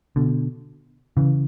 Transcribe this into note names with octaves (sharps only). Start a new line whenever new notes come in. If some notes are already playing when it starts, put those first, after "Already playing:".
B2 D3
C#3 E3